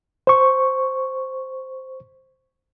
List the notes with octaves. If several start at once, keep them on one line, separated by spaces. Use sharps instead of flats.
C5 C#6